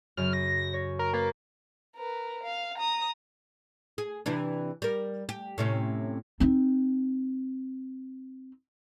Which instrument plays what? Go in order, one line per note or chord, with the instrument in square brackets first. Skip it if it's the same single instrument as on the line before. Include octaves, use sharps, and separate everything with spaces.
[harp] F#2 C#3 [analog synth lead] F6
[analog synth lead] A#6
[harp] C#5
[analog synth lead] A#4
[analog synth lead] A#3 [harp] B4 A6 B6
[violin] A#4 B4
F5
A#5 D#6
[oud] G#4
C3 E3 D4
G3 A#4
G4
A2 C3 C#4
[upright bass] C4 D#4